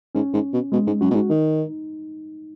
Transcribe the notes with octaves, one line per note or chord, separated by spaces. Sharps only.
G#2 C#4
G#2
B2
B2 G#3
G#2
F#2 F#4
B2
G#2
D#3 D#4